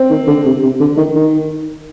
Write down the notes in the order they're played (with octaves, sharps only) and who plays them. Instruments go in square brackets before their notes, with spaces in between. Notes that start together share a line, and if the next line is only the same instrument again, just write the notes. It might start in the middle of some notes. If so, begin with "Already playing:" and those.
Already playing: [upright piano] C4
[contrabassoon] D#3
D3
C3
C3
D3
D#3
D#3